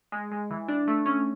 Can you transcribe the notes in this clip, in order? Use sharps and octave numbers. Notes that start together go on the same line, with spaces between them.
G#3
G#3
E3
D4
A3
C#4